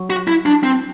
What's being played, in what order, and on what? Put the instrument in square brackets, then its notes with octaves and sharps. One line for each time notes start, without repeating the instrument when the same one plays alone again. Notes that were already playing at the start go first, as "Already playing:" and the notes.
Already playing: [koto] F#3
[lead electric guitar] F#4
E4
D4
C4